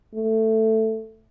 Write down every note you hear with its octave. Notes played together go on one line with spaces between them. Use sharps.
A3